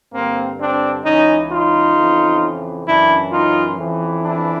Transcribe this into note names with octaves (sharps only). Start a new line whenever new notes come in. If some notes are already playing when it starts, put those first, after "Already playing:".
G2 D3 A#3 C4
C4 D4
C#2 C#3 E3 C#4 D#4
D#4 F4
F2 C#3 E3
F#2 C#3 E3 D4 E4
D#4 F4
F2 C#3 E3
D4 E4